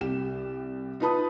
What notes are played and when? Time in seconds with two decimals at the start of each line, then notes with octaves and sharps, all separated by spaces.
0.01 C2 G4 E7
1.00 D#4 F4 B4 A5 B5 D#6